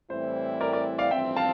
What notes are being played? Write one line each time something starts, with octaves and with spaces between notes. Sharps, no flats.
A2 E3 G3 C4 E4 C5
A#4 D5
A#4 D5
D5 F5
A1 G2 F3 C4 E5 G5
F5 A5